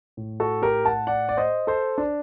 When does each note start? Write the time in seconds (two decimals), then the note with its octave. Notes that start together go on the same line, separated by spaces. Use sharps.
0.17 A2
0.40 F#4 A4
0.62 G4 A#4
0.85 F#5 A5
1.07 D5 F#5
1.29 D5
1.37 C5 D#5
1.67 A4 C5
1.98 D4